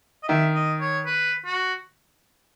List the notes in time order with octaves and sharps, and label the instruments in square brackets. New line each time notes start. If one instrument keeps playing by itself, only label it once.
[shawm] D#5
[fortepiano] D#3 [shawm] E5
[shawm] D#5
C#5
B4
F#4